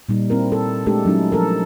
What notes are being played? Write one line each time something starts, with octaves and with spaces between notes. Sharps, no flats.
A#2 G3 D#4
C4 E4 A#4
A4
G#3 A3 D4 G4 A4
F#3 C#4 D#4 E4
F3 A4 A#4